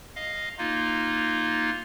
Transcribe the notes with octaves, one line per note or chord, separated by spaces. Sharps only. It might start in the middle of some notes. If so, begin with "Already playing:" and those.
D#5 F5
A#3 D#4 F4